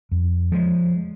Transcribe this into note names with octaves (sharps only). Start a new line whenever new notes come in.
F2
F3 G#3